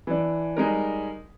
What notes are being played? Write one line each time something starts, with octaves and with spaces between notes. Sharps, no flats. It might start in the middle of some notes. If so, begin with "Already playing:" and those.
E3 D4
G3 G#3 D#4 A#4